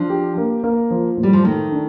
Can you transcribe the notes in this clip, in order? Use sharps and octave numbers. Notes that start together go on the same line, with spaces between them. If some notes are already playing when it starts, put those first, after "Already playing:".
Already playing: F3 D4
G4
A#3
A#3
F3
A2
G3
F3
D#3 A3
D4